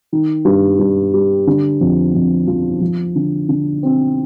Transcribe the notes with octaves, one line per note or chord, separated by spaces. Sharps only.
D#3
G2
G2
G3
D3
F2
F2
F3
F3
D3
D3
C4